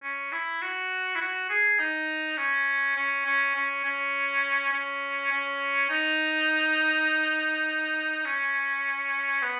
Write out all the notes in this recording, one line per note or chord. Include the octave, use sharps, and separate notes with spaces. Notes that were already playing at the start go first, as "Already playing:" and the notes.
C#4
E4
F#4
E4
F#4
G#4
D#4
C#4
C#4
C#4
C#4
C#4
C#4
C#4
D#4
C#4
B3